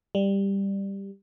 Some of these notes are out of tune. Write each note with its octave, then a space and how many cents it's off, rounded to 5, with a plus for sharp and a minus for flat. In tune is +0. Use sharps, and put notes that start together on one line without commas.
G3 +10